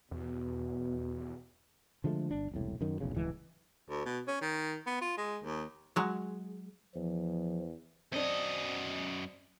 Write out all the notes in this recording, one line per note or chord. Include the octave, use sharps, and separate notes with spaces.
E2 B2
D3 F3 G#3 A3
G1 D4
E1 C2 A2
F#2 D#3 F#3
F1 B1 E2 C#3
D1 C#2 E3 G#3
D2
B2
C#4
D#3
B3
F4
G#3
D#2
F#3 G#3
E2 F3
F#2 C4 D4 D#5